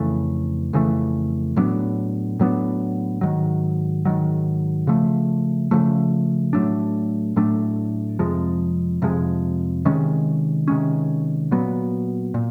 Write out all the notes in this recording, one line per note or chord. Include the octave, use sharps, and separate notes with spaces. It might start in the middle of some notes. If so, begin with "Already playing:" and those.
Already playing: F2 C#3 E3 A3
F2 C#3 E3 A3
A2 F#3 B3 D4
A2 F#3 B3 D4
G#2 D#3 F#3
G#2 D#3 F#3
C#3 F3 A3
C#3 F3 A3
A2 F#3 A3 D4
A2 F#3 A3 D4
F2 C3 F3 G#3
F2 C3 F3 G#3
C3 D#3 G#3 C#4
C3 D#3 G#3 C#4
A#2 F#3 B3
A#2